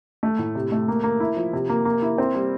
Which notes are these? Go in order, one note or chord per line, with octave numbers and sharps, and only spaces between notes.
A3
A2
C3
A3
A#3
A#3
E4
F3
C3
A#3
A#3
E4
C4
G3